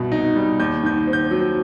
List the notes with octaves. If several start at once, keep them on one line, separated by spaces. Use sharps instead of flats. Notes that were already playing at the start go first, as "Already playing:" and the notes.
Already playing: C2 B2
D#4
G3
D#2 G6
D#3 G6
C4
G6
F#3